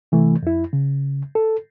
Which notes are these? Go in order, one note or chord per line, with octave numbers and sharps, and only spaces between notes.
C3 E3 A3
F2 E4
C#3
A4